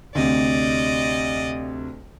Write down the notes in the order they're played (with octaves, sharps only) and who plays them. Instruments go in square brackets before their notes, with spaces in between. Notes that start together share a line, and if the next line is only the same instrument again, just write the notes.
[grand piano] D2 C3 [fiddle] D5 D#5